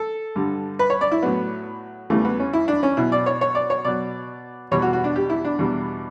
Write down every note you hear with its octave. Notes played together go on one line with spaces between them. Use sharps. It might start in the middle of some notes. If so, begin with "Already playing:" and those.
Already playing: A4
G2 D3 G3
B4
C#5
D5
E4
A2 F#3 B3
E2 C#3 E3 G3 A3
B3
C#4
E4
D4
C#4
B2 F#3 E4
D5
C#5
C#5
D5
C#5
B2 F#3 D5
E2 B2 G3 C#5
F#4
F#4
D4
G4
E4
D4
E2 B2 G3